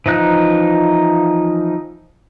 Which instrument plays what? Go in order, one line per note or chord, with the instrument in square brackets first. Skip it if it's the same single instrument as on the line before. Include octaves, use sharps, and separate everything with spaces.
[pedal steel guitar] E3 F3 D#4 F#6